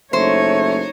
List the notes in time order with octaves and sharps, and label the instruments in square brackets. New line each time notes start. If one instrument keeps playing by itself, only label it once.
[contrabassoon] F#1 [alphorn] A3 [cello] D#4 C#5 [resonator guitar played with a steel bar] C5